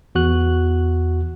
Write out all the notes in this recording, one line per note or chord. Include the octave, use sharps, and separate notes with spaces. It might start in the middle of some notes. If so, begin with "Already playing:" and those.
E2 F#4 F#6